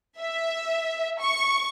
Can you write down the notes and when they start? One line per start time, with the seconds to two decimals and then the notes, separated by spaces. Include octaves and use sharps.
0.19 E5
1.19 C#6